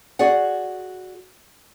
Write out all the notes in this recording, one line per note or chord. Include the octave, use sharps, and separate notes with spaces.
F#4 G#4 D5 F#5